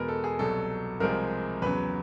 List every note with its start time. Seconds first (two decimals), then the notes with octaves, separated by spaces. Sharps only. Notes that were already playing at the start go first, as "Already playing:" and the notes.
Already playing: E2 B2 G#3 A#4 B4
0.08 A4
0.24 G#4
0.39 C2 B2 F#3 A4
1.00 C2 C3 F3 G#3 A#4
1.62 E2 C#3 F#3 B4